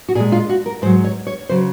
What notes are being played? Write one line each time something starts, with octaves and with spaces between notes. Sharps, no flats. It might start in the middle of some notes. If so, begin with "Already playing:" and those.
F#4
A#2 G#3 G#4
F4
F#4
A#4
G#2 F#3 C5
C#5
C#5
C#3 F#3 C5